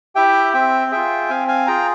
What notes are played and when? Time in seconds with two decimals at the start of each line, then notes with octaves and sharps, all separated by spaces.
0.15 E4 G4 E5 G5
0.53 C4 E5 G5
0.91 F4 G#4 E5 G5
1.29 C4 F5 G#5
1.48 F5 G#5
1.67 F4 G#4 G5 A#5